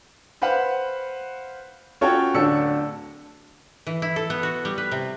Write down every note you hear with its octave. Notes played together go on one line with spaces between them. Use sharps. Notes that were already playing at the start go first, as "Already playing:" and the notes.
B4 C5 F5 F#5 B5
C#4 F4 F#4 A4 C#5 G5
D1 D4 A4 E6 C#7
E3
E4
A4
B3
F#4
G3
B4
C3